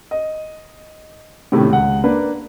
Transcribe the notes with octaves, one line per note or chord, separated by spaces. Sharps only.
D#5
A2 C3 D#3 A3 C#4
C#2 F#5
A#3 D4 B4